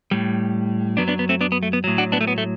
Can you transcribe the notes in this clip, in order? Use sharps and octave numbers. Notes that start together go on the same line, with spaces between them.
A2 G3
F#2 F#3 B3 D4
B3 D4
B3
A3 C4
B3 D4
B3
A3
B3
A2 F#3
D4 F#4
B3 D4
A3
B3
A3